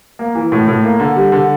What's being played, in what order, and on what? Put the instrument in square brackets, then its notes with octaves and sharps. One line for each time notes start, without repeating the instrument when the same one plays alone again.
[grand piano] A#3
E3
A2
A2
A#3
D3
G3
D3